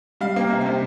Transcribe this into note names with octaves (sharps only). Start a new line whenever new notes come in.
G3 F5
A#3 G5
C3
C3 G5